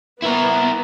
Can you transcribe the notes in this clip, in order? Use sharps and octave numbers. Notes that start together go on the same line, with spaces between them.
B3 E4 A#4